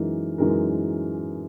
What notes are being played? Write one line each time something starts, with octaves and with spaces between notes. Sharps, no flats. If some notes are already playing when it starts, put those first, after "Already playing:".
Already playing: F#2 E3 G#3 D#4 A#4
F#2 E3 G#3 D#4 A#4